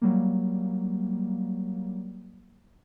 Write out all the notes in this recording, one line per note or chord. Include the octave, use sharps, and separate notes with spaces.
F#3 G3 A#3